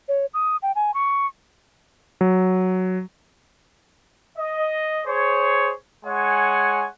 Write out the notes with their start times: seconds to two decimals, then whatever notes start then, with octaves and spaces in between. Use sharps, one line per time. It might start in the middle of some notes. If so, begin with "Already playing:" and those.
0.08 C#5
0.34 D#6
0.62 G5
0.75 G#5
0.94 C#6
2.21 F#3
4.38 D#5
5.06 G#4 C5 C#5
6.05 G#3 C#5 F#5 G#5